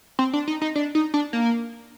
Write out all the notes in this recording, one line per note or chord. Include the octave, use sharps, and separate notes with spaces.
C4
D4
D#4
D#4
D4
D#4
D4
A#3